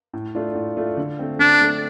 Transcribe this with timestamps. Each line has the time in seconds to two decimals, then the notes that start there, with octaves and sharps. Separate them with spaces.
0.13 A2
0.35 A3 D4 F4
0.55 A2
0.77 A3 D4 F4
0.97 D3
1.19 A3 C4
1.39 D3 D4
1.61 A3 C4